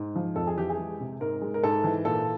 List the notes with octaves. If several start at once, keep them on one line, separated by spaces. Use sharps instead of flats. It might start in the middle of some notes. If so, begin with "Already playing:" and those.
Already playing: G#2
F3
F2 A4
G#4
E3 G4
G#4
G#3
C3
G#2 A#4
G#3
A#4
G#2 A4
E3
A#2 A4